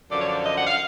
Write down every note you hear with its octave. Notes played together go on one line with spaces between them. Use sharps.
F#2 D3 F3 D5
C#5
D5
D#5
F#5
F5